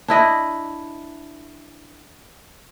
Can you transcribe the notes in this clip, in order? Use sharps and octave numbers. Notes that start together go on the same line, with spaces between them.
D4 E4 D#5